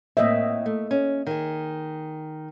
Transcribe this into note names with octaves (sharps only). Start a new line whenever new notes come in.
A2 A#3 C4 D#5 E5
A3
C#4
D#3 G#4